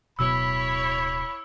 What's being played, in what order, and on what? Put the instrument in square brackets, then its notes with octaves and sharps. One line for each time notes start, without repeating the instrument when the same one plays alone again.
[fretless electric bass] D1 B2 F#3 [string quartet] E4 C#5 [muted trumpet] B5 [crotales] E6